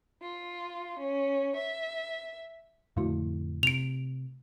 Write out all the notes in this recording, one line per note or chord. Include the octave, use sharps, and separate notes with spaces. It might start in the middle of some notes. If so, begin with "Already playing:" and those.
F4
C#4
E5
F2 A2 D3 A3 E4 F#4
C3 D7 F7